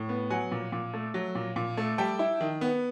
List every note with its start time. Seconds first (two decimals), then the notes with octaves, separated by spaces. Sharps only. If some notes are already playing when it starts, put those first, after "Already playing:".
Already playing: A2
0.09 B3
0.30 F#3 F#5 G#5
0.52 A#2
0.72 A#2
0.94 A3
1.14 F#3
1.35 A#2
1.56 A#2
1.77 A3
1.98 G3 G5 A5
2.19 E4
2.40 D#3
2.61 B3